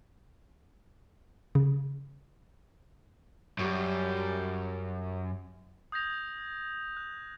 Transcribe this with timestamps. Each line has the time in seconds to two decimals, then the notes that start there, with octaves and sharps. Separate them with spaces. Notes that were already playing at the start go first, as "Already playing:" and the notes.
1.55 C#3
3.59 F#2 G3
5.92 D#6 G6 G#6 A#6 F7
6.97 F#6